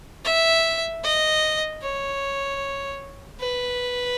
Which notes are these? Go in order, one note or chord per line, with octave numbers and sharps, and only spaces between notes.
E5
D#5
C#5
B4